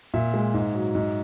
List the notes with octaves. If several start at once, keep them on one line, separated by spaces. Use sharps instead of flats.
A#2 E5
G#3
G#2
F#3
G#2